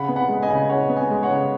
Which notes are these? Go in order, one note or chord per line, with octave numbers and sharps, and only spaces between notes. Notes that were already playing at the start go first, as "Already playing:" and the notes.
Already playing: C#3 F#5 B5
B3
F#5 B5
G#3
D#5 G#5
C#3
C#3 C#5 F#5
B3
D#5 G#5
G#3
C#5 F#5
C#3